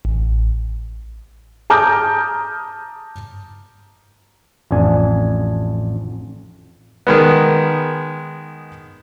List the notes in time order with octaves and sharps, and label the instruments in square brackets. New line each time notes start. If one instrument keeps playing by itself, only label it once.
[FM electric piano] A1
[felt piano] A5 A#5 D6 D#6 F6 G6
[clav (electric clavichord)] A1 F2 D4 G#5
[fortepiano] D#3 G#3 B3